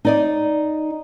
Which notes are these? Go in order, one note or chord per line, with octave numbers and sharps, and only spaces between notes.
D#4 D5 D#5